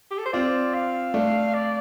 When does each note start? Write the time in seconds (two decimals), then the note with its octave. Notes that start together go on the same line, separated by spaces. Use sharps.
0.11 G4
0.18 A4
0.26 C5
0.33 C4 F4 D5
0.74 F5
1.14 A3 D4
1.54 D5